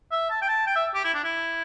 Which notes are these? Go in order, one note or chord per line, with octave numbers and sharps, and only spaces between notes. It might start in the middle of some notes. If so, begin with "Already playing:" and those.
E5
A5
G5
A5
G5
E5
G4
E4
D4
E4